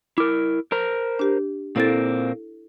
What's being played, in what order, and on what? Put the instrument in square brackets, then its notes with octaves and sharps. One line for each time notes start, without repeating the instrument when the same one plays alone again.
[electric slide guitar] E4 A#4 [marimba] D6
[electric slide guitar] A#4 C5 A#5
[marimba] D4 G4
[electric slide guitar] A#2 A#3 C4 [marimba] E4 A4 A6